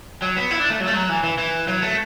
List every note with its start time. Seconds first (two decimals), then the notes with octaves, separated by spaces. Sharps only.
0.22 F#3
0.37 B3
0.51 E4
0.60 D4
0.70 A3
0.80 F#3
0.87 A3
0.94 F#3
1.09 E3
1.23 E3
1.38 E3
1.68 F#3
1.82 A3